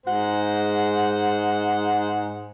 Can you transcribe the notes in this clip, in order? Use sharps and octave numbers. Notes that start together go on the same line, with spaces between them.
G#2 G#3 C5 F#5